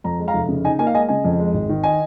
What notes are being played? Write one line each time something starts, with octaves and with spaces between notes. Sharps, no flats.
F2 A#5
G#3
F5 A#5
F1
C#3
D#4 D#5 G#5
A#3 D#5 G#5
F5
G#3 D#5 G#5
C#3 D#5 G#5
F2
G#3
G#1
D#3
D#5 G#5